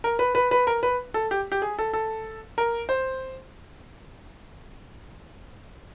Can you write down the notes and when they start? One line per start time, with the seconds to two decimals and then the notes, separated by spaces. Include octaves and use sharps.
0.04 A#4
0.19 B4
0.35 B4
0.51 B4
0.67 A#4
0.83 B4
1.14 A4
1.31 G4
1.52 G4
1.62 G#4
1.79 A4
1.93 A4
2.58 A#4
2.89 C5